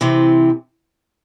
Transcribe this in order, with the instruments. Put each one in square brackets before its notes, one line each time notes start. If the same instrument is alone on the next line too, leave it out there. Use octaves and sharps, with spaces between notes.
[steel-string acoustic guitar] C3 E3 C4